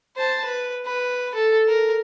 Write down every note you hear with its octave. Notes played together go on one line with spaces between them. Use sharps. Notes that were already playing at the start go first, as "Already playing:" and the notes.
C5 A5
B4
B4
A4
A#4